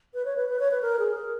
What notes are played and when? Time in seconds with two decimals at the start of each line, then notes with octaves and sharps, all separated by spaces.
0.14 B4
0.25 C#5
0.37 B4
0.49 B4
0.60 C#5
0.71 B4
0.82 A#4
0.99 G#4
1.15 A#4